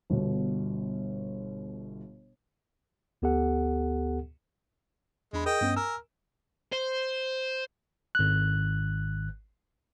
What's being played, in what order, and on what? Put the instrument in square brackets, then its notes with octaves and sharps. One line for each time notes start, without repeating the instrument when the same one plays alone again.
[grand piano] G1 B2
[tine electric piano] D2 B3 G4 A4 F#5
[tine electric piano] E2 D4 B5 [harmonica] G#3
[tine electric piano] G#4 A#4 [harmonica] D#5 G5
[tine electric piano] G2 B3 C#4
[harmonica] A#4 [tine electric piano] G#5 E6
[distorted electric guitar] C5
[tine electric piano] G#1 F#6